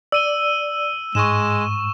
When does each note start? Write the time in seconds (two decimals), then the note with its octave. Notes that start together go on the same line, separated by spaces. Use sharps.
0.12 D5 E6 D#7 G7
1.15 G#2 G#3 C#6 E7